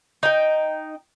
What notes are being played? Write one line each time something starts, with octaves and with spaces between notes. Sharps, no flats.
D#4 G5